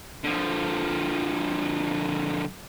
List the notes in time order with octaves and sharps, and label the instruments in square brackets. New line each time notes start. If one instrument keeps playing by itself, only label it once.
[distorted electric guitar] D3 F3